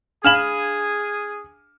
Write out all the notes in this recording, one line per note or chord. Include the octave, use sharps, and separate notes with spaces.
D4 G#4 F5 B5 F6 E7 F#7